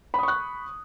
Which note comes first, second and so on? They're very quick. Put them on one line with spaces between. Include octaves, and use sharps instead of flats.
B5 D#6 C#6 F#6